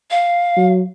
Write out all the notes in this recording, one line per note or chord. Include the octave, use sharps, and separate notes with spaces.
F5
F#3